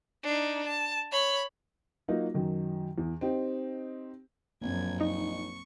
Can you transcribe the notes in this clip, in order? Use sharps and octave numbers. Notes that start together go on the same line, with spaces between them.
D4 D#4
A5
C#5 B5
F#3 A#3 D#4 F4 F#4
F#2 D#3 F#3
E2
C4 D#4 G4
A#1 F#2 A#3 C4 G#6
D#4 C#6